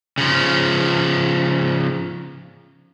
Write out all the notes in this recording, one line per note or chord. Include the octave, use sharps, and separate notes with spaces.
C#3 F3